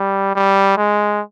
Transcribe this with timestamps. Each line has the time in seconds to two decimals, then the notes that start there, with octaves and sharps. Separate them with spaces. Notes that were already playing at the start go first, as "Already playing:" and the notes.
Already playing: G3
0.35 G3
0.77 G#3